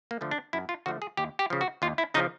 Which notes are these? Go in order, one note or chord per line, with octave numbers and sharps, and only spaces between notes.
A#3
D3 F3 A3
D4
F#2 E4
F4
D3 F3 A3 F#4
G#4
D#2 G4
G4
C#3 F3
F#4
D#2 F4
E4
C#3 F3 D#4